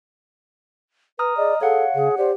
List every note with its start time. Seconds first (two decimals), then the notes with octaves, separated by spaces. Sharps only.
1.19 B4 A#5 D#6 F6
1.37 G#4 D5 D#5
1.61 G#4 A4 C#5 F5 F#5
1.95 C#3 G#4
2.17 G4 C5 D5